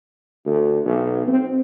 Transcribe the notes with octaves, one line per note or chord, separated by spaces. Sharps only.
D2
B1
C4